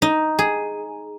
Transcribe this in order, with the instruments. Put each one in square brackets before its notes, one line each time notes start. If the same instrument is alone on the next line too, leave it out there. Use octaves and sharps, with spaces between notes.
[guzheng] D#4
G#4